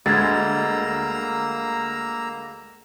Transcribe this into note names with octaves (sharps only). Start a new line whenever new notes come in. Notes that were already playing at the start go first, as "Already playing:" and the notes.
D2 G#3 A#3 A#5 E6 G#6 A6